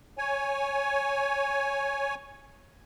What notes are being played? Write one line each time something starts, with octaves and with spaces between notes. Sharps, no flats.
C#5 G#5